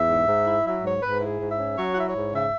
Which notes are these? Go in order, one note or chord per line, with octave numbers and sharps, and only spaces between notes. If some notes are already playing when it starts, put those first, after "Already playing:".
Already playing: E2 E5
G#2
G#2
E4
F#3 E5
G#2 C#5
G#2 B4
E4 G#4
G#2
E5
C#4
F#3 C#5
F#5
E4 E5
C#5
G#2
C#3 E5